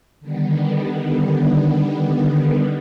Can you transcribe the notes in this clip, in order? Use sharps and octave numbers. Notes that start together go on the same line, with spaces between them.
D3 D#3 G3 B3